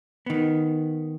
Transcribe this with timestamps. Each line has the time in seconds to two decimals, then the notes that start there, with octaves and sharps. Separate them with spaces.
0.26 D#3 B3